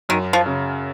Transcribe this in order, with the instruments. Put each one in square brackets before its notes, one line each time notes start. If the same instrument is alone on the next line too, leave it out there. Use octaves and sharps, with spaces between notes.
[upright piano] F#2 [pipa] D#3
[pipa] F3
[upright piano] C#3